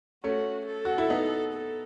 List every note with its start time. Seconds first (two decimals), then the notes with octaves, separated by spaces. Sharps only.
0.24 A3 C#4 F#4
0.67 A4
0.85 F#4
0.98 E4
1.10 B3 D#4
1.53 A4